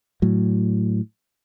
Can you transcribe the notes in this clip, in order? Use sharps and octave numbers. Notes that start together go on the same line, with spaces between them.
A2 F#3